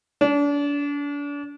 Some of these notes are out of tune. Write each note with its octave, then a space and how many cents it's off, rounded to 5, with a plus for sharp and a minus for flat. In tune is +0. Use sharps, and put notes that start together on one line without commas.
D4 -35